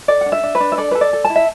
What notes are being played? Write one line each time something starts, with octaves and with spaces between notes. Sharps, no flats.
A4 D5
D4 F#5
E5
D4
B4
D4
E5
A4 D5
A4 B4
D5
A4
A5
E4
E5